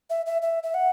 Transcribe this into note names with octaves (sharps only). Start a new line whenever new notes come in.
E5
E5
E5
E5
F#5